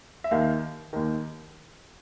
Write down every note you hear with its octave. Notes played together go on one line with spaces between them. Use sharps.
E5
D#2 D#3 F5
D#2 D#3